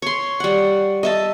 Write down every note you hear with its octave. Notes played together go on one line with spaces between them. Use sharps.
C#5 C6
G3 F#5
D#5 E5 A5